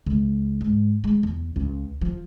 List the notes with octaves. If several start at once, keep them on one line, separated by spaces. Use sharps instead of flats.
C#2
G#2
G#3
E2
C#2
F3